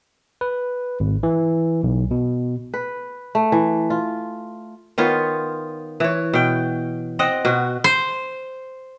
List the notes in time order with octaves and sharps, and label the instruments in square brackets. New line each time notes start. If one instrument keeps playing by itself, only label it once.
[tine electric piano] B4
G#1
E3
B1
B2
[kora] B4
A3
E3
F4
D#3 B3 F4 C#5
E3 C#5
B2 G5
C4 D#5 F#5
B2 F#4
[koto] C5